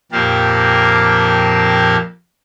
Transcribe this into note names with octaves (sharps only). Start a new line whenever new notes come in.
F2 A#2 A#3 G4 F5 A5